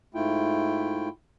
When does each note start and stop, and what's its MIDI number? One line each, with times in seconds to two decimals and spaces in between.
0.14 1.09 44
0.14 1.09 57
0.14 1.09 64
0.14 1.09 65
0.14 1.09 79